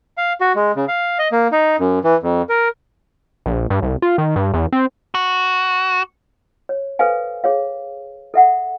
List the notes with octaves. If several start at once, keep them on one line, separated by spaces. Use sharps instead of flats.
F5
F#4
G#3
C#3
F5
D#5
A#3
D#4
F#2
E3
F2
A#4
A#1
G2
C2
F4
D#3
G2
E2
C4
F#4
C#5
A4 B4 C5 F5 G#5
G#4 C#5 F5
A4 E5 F#5